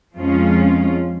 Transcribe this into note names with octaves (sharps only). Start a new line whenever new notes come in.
F2 F3 G#3 C#4 F4